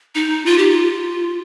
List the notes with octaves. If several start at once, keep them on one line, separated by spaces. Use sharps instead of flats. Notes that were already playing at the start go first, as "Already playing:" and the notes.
D#4
F4
G4
F4